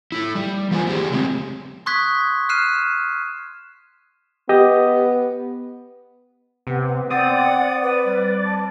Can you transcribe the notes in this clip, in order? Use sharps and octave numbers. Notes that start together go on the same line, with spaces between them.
A3 E4
G3
E3 A#3 F4 A#4 C5 G#5
A3 E4 G4 G#4
C#3 F#3 G#3 C4
C6 C#6 D#6 F#6 G#6 B6
F6 F#6 C7 D#7 E7
B3 G4 D#5
C3 B3
C4 D5 F#5 D#6
B4
G3
A5